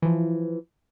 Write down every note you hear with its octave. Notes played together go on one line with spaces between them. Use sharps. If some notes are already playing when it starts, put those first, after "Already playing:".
E3 F3